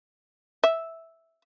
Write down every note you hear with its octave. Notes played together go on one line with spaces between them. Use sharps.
E5